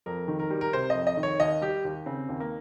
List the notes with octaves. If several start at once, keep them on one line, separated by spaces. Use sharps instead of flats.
F2 A#4
D#3
A#4
G3
A#4
C3 C5
F2 D#5
D#5
D#3
C#5
D#2 D#5
G3 G4
D#2
C#3 C4
D#2
A#3